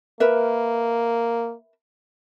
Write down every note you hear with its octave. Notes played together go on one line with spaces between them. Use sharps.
A#3 A#4 B4 E5